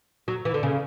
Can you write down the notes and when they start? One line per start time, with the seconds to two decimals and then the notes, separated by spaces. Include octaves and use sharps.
0.28 F#3
0.45 E3
0.54 D3
0.63 C#3